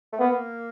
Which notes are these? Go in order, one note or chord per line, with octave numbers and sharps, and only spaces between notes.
A3
A#3 B3